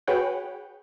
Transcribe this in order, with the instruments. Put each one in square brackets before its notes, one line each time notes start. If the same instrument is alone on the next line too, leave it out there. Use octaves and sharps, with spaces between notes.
[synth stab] F#4 G#4 B4 C#5 F#5 G5